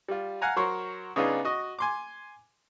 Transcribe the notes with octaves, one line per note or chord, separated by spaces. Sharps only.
G3 F4
F5 F#5 G#5 A#5
F#3 A#4 C5 C#5
C#3 B3 D4 D#4 F4 G#4
F#4 D#5
G#5 C6 D6